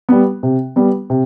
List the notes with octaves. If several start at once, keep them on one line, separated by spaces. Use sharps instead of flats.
G3 B3
C3
G3 B3
C3